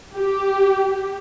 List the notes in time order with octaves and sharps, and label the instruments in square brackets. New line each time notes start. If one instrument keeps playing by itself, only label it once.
[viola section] G4